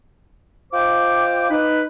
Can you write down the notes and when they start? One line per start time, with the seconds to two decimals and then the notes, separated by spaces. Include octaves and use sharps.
0.73 F4 C5 D#5 G5 D6
1.50 D#4 B4